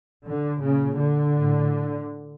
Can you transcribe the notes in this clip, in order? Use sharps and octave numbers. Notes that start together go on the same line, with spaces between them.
D3
A#2 C#3
D3
A2